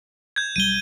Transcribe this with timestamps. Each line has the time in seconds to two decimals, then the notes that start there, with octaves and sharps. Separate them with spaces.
0.36 G6 G#6
0.56 B1 G3 D#7 G7